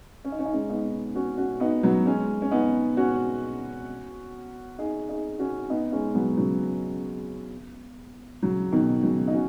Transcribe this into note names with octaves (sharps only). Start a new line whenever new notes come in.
C#4
D#4
C#4
D#4
G#3 C#4
B3 D#4
C#4 F#4
C#4 F#4
B3 D#4
F#3 B3
G#3 C#4
C#4
B3 D#4
C#4 F#4
D#4 G#4
D#4 G#4
C#4 F#4
B3 D#4
G#3 C#4
F#3 B3
C#3 F#3
C#3 F#3
B2 D#3
C#3 F#3
D#4
C#4 F#4